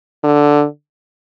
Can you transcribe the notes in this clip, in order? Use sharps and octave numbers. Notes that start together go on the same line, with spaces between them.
D3